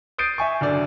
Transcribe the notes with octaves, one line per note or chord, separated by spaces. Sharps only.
D#6 G6 A6 C7 D7 D#7
E5 G#5 C#6
F#1 D3 D5